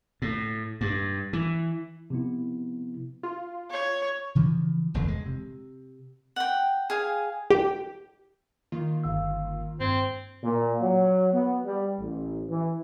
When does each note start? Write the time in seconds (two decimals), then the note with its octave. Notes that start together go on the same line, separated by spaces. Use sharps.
0.22 A2
0.81 G2
1.33 E3
2.10 C3 F3 B3 E4
3.23 F4
3.70 C#5
4.35 C#3 E3 F3
4.94 F1 E2 A#2 D3
5.08 G#3
5.26 C3
6.36 F#5 G5
6.90 G#4 F5 G#5
7.50 G4
8.72 D#3 A#3 F4
9.04 G1 F5 E6
9.80 G2 C4 G#6
10.44 A#2
10.80 F#3
11.33 B3
11.65 G3
11.99 A1
12.49 E3